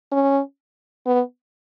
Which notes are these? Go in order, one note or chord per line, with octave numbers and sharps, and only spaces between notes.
C#4
B3